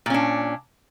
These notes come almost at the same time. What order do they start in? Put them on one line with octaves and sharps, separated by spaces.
A#2 C#4 D4